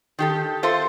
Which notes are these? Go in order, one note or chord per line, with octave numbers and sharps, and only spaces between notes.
D#3 G4 A4
C4 F4 A4 C5 E5